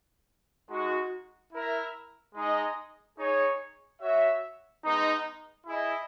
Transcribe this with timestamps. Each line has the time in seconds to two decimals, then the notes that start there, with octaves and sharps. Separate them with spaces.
0.70 G#3 D#4 F#4
1.53 E4 A#4 E5
2.35 G#3 D#4 G#4 D#5
3.18 D#4 G#4 C#5
4.01 F#4 C#5 E5
4.84 G#3 B3 D#4
5.66 E4 G#4 D#5